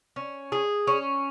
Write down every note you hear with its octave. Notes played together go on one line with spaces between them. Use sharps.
C#4
G#4
C#4